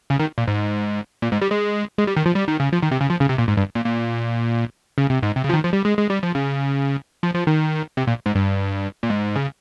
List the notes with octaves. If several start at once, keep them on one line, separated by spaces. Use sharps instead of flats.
C#3
D#3
A#2
G#2
A#2
G#2
G3
G#3
G#3
G3
D#3
F3
G3
D#3
C#3
F3
D#3
C3
C#3
F3
C#3
C3
A#2
G#2
G2
A#2
A#2
C#3
C3
G#2
C3
C#3
F3
D#3
F3
G3
G#3
G#3
G3
F3
C#3
F3
F3
D#3
C3
A#2
G#2
G2
A#2
G#2
C#3